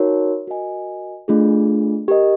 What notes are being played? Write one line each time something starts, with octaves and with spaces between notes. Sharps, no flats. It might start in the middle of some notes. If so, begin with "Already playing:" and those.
Already playing: D#4 F#4 A#4 C#5
F#4 A#4 D#5 G#5
A3 D4 F4 G#4
G4 A#4 D#5